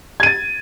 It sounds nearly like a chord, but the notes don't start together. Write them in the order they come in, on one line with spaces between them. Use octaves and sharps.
G#6 D#7 A6